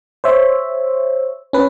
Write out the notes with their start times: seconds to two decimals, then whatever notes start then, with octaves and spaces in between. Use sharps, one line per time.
0.24 C5 C#5 E5
1.53 C#4 B4